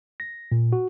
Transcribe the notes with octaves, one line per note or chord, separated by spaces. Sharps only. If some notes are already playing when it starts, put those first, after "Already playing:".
A#6
A#2
F#4